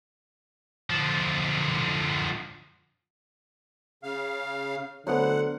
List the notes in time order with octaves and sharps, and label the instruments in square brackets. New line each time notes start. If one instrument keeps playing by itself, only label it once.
[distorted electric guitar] D3 F3
[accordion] C#3 F5
[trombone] D3 [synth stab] F#3 A3 B3 [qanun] A#4 C5 [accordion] F#5